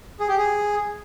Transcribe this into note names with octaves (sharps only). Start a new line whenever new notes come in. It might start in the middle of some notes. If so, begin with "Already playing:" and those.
G#4
G4
G#4